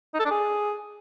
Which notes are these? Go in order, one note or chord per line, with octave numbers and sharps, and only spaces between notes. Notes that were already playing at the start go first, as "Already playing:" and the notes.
D#4
A4
D4
G#4